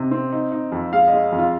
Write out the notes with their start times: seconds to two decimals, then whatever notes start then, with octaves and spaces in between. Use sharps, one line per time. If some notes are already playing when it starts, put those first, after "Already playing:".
Already playing: C3 C4 D#4
0.11 C4
0.32 D#4
0.52 D#4
0.72 F2
0.92 G#3 F5
1.08 D#5
1.13 G#3
1.32 F2
1.38 F4